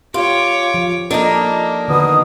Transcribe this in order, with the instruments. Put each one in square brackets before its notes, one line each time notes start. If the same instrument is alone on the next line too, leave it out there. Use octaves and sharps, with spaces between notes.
[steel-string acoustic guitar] F4 [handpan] G4 [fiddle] C#5 D6
[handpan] F3
[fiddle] A#3 [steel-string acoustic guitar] D4 D#4 [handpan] A4 D#5
[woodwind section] B2 D#6 [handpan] D3 D#3